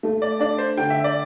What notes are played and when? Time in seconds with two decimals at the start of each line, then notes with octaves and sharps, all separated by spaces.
0.03 A3
0.22 D5
0.39 D4 D5
0.58 C5
0.77 D3 G5
0.90 E5
1.04 D5